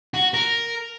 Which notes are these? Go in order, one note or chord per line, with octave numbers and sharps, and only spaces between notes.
F#4
A#4